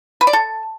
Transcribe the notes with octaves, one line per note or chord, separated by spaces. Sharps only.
B4
D5
A4